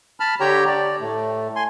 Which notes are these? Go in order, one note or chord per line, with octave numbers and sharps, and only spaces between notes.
A5 B5 F6
D3 G4 C#5 G5 A#5
D5
A2 A3
G#5 C6